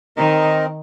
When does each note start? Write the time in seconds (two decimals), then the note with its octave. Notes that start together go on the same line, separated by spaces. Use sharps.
0.17 D#3 C4 D#4 A#4 D#5